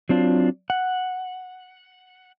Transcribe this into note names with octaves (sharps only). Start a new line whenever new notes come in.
F#3 C4 D4 F4
F#5